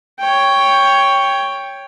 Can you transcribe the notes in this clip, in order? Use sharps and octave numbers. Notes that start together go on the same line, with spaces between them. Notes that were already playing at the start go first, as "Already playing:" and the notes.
C#5 G5